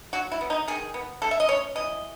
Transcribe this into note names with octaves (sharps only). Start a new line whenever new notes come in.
F#3 F#4
E4
B3
D#4
D#3 G#4
B3
A3 A4
E5
D#5
C#4 C#5
E3 D#5